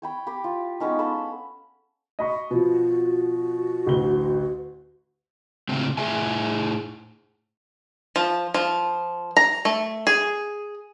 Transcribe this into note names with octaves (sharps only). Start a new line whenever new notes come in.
C#5 G5 B5
G4 B5 D6
F4
G#3 B3 C#4 D#4
A4 F5 B5 E6
D#5 B5 C#6
B2 F3 F#4
A1 D2 G7
A2 C#3 C4
A2 E4 G#4 E5 G#5
F3
F3
A#5
A3
G#4